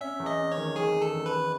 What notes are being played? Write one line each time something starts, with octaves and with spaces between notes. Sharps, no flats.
C#4 E5
E2
D#5
C#4
C#5
D#3
D#3 G#4
D#3
A4
E2
B4
D#3